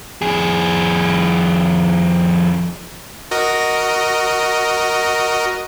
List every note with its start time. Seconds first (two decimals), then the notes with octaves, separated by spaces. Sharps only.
0.22 F2 G#4
3.31 F#4 A#4 D#5